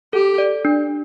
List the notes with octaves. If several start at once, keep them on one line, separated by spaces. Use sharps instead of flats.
G4 A4
D5
D4